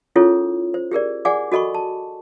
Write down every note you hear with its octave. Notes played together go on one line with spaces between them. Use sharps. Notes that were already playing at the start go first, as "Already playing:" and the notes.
C#4 E4 F4 G#4 A4 C#5
C5
G4 G#4 A#4 D5
G#4 D5 F#5 G#5 D6
F#4 A4 D#5 B5 C#6
A5